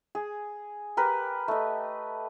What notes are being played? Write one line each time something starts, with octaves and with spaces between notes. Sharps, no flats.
G#4
G4 A#4 B4
A3 D#5